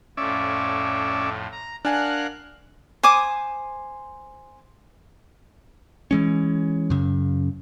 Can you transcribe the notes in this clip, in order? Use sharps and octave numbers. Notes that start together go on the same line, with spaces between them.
F2 A2 F3 C#4 D5 E5
A#5
D4 A#4 F5 F#5 G#5 F#6
C5 G#5 D6 D#6
E3 G#3 C#4
F#2 C#3